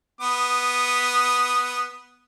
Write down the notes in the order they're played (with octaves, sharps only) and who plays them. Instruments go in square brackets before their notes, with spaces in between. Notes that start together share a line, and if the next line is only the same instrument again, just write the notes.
[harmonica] B3 D#6